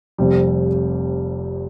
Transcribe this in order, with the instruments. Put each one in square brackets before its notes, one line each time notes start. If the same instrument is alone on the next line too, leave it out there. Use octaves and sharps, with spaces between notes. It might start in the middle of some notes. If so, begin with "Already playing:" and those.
[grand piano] F1 F2 C3 G3